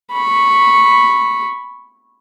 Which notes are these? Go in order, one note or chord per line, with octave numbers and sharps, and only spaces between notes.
B5 C#6